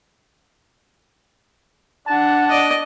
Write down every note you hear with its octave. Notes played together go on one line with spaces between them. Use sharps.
D4 F#5 A5
D5 D#5